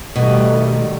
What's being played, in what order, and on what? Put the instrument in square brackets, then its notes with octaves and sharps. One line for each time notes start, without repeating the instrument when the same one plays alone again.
[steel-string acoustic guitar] B2 [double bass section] D#3 G3 A3